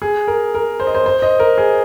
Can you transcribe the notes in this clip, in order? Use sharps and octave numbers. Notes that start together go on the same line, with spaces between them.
G#4
A#4
A#4
C5
D#5
C5
C5
D#5
A#4
G#4